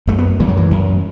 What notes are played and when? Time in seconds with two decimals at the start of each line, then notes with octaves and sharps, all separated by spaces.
0.07 F#2 A3
0.19 B3
0.40 F#2 E3
0.48 F#3
0.57 E3
0.71 F#2